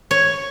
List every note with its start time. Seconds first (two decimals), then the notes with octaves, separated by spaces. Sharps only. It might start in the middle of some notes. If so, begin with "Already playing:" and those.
0.11 C#5